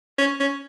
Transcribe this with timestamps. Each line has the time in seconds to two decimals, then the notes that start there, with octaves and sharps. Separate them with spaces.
0.19 C#4
0.40 C#4